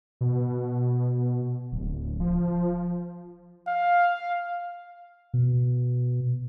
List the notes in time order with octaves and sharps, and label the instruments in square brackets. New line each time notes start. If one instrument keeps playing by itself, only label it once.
[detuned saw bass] B2
D1
F3
[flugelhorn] F5
[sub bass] B2